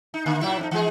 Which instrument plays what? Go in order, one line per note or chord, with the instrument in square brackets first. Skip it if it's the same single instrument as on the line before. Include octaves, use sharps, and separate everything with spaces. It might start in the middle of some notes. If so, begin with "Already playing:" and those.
[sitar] D#4
D3 A#3
A#2 F#3 E4
F2 C#4 D#4
E3 G#3 G#4